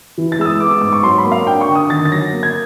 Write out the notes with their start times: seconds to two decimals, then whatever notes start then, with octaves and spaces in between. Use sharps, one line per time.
0.18 E3
0.32 A6
0.39 G#3 E6
0.45 D#6
0.60 B3 D6
0.71 D6
0.81 G#2 D6
0.93 C#6
1.03 F#3 C6
1.18 B5
1.25 A#3
1.32 F5
1.46 D4 G5
1.61 C#6
1.68 D3
1.75 D#6
1.89 D#3 A6
2.05 A6
2.11 F#3 A#6
2.33 A#3
2.43 G#6